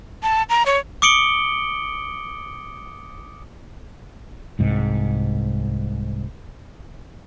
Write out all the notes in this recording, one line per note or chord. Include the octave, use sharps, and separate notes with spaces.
A5
A#5
C#5
D6 D#6 C#7 D7 F#7 G7
C2 G#2 C3